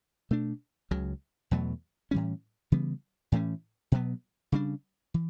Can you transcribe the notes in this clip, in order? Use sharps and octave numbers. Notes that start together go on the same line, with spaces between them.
B2 A3 D4
C#2 C#3 F#3
E2 B2 F#3 A3
A2 E3 G3 C#4
C#3 E3 G3 B3
A2 E3 A3 C#4
B2 F#3 B3
C#3 G3 D4
E3